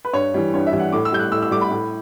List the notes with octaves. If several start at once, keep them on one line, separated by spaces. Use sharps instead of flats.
B4
G2 C#5
E3 G3
G2 C#5
E5
E3 G3
F#5
A2 D6
E6
G3 G6
F#6
A2 E6
E6
G3 D6
B5
A2